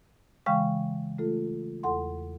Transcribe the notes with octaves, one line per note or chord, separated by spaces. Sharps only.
C#3 E3 G#3 F5 G5 C#6
A3 F4 A4
E2 A4 F#5 C6